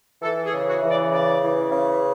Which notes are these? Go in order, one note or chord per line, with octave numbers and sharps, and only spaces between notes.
E3 A4
G#4
C#3
F#4
E3
D5
C#3 D5
E3
C#3